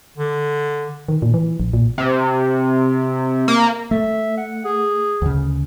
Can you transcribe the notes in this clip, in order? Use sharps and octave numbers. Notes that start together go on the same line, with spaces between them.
D3
D#3
A#2
E3
A#1
A#2
C3
A#3
A3 E5
F#5
G#4
D2 C#3